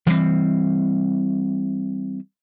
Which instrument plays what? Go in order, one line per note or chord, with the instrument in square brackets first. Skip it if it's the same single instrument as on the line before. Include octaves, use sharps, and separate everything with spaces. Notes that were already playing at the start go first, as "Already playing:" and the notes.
[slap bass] E3 G3 G#3 C4